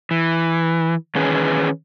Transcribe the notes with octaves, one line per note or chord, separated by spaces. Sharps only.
E3
D#3 E3 C#4 G#4 B4